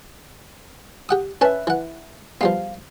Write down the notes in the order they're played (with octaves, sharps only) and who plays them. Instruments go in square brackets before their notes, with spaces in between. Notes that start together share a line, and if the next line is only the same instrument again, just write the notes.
[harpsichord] G4 F#5 D#6
[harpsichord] C#4 C#5 A5 [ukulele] B4 E5
[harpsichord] E3 F#5
[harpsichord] F3 G3 B3 [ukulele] F5